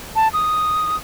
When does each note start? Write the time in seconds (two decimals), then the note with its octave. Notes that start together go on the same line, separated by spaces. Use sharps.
0.16 A5
0.33 D#6